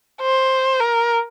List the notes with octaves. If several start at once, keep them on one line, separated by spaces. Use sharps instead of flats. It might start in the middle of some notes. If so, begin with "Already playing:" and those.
C5
A#4